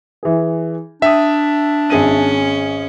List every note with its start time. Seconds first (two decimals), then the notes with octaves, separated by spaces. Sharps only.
0.23 E3 G#4
1.02 D4 E5 G5 D#6
1.90 G#1 C#4 G#4 D#7